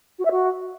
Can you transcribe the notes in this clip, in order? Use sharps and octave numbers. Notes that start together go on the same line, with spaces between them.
F#4
E5
F#4